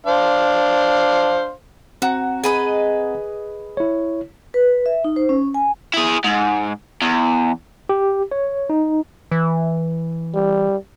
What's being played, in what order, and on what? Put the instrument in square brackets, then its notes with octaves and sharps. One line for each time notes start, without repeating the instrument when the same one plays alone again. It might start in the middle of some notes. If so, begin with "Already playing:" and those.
[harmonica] D4 C5 F5
[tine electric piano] C4 F#5 A#5 [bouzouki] F#4
[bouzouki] G#4 B4 D#5
[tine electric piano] E4 C#5
[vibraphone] B4
E5
D#4
C5
C#4
G#5
[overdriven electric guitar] E4 G#4
G#2
E2
[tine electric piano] G4
C#5
D#4
[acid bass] E3
[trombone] G3